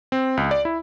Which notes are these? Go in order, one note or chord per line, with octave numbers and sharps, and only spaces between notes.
C4
C#2
D5
E4